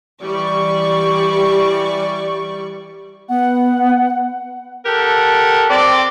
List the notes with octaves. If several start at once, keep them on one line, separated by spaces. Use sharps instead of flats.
E3 G3 D5 C#6
B3 F#5
G4 A4 A#4 F#5
C4 D5